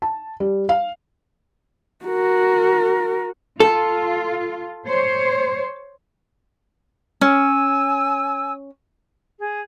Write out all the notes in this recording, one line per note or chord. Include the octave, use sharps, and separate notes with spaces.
A5
G3
F5
F#4 A#4
F4 A4
C5 C#5
C#4 G#5 E6
G#4